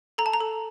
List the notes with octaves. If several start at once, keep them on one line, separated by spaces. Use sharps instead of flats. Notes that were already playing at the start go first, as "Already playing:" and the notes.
A4 A#5
A5
A#5
A4